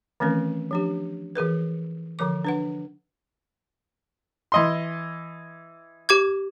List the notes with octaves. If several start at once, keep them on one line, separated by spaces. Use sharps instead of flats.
D#3 E3 A3 C4 C#4 A#4
F3 D4 G4
E3 G#4 A#4 B4
D3 F3 A#4 D6
D4 B4 F#5
E3 D#5 C6
G4 D6 G#6